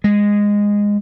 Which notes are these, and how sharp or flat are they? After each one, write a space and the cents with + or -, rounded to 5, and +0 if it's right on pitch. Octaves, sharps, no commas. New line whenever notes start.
G#3 -15